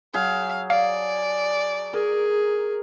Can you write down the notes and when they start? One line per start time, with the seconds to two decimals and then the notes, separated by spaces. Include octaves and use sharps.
0.14 F#3 G#4 F5
0.70 D5 F5
1.93 G#4 A#4